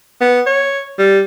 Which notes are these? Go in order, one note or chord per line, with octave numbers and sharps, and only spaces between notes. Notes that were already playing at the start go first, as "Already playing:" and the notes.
B3
C#5
G3